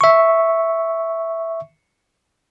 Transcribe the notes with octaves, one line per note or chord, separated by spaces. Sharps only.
E5 C#6